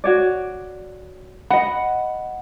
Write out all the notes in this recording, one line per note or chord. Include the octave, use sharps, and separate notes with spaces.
F#4 C#5 D5
D#5 F#5 B5